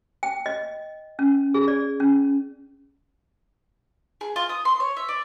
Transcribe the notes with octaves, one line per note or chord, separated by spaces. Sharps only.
G5
D#5
C#4
G#4
D5
C#4
G#4
F4
D#6
C6
C#5
E5
D5